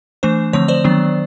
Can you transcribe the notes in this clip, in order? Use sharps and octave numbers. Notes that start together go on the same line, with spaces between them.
E3 A3 D4 C5
D3 F3 A3 C4 C#5
C5 D5
D#3 F#3 B3 D4